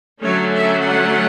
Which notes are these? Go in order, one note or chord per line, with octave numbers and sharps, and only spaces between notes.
D3 F#3 A3 C#4 C#5
E5
F#5